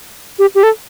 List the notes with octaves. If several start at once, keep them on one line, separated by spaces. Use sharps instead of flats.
G4
G4
A4